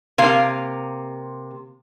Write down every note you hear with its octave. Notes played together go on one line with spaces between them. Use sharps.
C3 A#3 F5